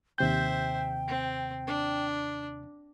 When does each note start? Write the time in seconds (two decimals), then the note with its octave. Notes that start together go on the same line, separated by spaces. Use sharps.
0.18 D#2 C3 C5 E5 G5 G6
1.08 C4
1.67 D4